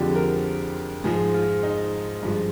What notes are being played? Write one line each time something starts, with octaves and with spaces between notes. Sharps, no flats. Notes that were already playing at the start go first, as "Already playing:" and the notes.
Already playing: F2 D3 F3 G#3 G4
A#4
G#2 F3 G#3 G#4
F4
D#4
G2 F3 G#3